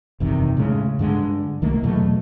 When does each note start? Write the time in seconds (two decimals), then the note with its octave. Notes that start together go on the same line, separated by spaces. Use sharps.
0.20 F#1 E2 C3 D#3
0.57 A2 C#3 G#3
0.99 G2 D3 G#3
1.62 C2 D#3 A3 A#3
1.83 E2 B2 F#3 A3